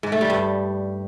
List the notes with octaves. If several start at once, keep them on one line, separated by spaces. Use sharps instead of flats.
G#2
A3
G3
G2